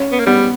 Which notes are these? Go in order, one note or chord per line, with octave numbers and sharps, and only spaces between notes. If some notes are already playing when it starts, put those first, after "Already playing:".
Already playing: C#4
B3
A#3
G3 B3